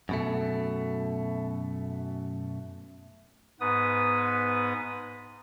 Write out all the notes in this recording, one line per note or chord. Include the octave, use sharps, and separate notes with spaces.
F#2 B2 A3
G#2 B3 B4 D#6